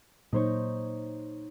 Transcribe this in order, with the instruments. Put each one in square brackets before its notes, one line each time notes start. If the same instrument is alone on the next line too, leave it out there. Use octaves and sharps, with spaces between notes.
[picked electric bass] A#2 F#3 A#3 [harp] D#4 C5 C#5